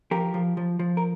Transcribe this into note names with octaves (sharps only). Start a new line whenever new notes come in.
F3 G4 A#4
F3
F3
F3
A#4